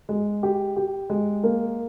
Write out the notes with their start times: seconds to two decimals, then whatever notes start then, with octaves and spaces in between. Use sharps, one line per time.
0.09 G#3
0.43 G4
0.76 G4
1.10 G#3
1.44 A#3